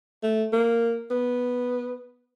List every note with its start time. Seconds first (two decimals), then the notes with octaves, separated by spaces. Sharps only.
0.23 A3
0.52 A#3
1.11 B3